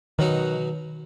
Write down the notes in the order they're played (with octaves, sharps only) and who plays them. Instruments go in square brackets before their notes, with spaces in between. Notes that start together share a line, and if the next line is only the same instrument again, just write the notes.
[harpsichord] B2 F#3 B3 D#4 [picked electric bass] D#3